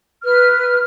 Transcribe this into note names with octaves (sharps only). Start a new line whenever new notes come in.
B4 F6